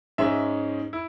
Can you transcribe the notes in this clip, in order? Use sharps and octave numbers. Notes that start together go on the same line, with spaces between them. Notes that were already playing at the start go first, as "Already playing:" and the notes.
G#2 G#3 C#4 E5
E4